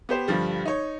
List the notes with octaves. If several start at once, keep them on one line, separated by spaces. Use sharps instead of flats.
B3 G4 C5
G2 D3 F3 G3
D#4 C#5